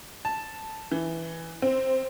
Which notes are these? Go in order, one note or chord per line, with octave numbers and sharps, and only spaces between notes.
A5
E3
C4